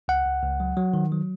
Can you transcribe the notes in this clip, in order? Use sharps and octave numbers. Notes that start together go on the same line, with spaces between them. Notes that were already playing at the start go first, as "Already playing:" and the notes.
C#2 F#5
C#2
C#2
F#3
F#3
D#3
F#3